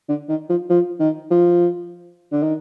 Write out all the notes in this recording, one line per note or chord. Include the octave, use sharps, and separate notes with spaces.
D3
D#3
F3
F3
D#3
F3
D3
D#3